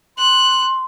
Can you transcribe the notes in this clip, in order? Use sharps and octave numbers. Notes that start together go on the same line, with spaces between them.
C6 F#6